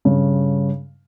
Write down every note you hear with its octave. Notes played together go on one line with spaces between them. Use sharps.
G2 C#3